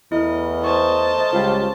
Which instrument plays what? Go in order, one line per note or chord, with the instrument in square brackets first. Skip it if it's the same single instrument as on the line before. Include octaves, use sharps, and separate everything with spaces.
[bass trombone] E2 [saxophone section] A3 A#4 D#5 [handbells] E4
[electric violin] C5 A5 [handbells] C#6 D#6
[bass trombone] C#2 [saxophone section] G3 F4